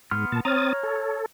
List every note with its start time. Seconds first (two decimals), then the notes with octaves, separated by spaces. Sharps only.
0.11 G#2 B3 C6 F6
0.32 A#2 A5
0.45 C4 C#5 A#5 D#6 F6 A6
0.83 A4